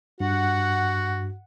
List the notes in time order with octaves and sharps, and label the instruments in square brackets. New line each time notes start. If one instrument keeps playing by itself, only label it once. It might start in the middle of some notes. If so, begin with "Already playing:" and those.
[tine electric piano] G2 [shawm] F#4 [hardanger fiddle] F#5